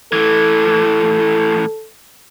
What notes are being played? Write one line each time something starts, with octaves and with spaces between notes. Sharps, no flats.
A2 E3 A4